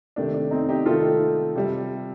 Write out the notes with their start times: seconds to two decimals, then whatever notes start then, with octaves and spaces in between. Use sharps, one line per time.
0.16 C3 D#3 A3 D4
0.34 D4
0.51 C4 D#4
0.69 D#4 G4
0.86 C3 D#3 A3 F4 A4
1.55 C3 G3